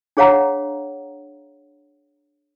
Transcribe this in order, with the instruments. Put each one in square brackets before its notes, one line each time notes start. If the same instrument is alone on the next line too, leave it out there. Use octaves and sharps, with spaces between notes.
[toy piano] D4 G#4 C#5 F5 F#5 A#5